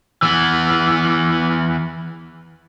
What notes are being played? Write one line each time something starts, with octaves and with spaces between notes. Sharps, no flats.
E3 B3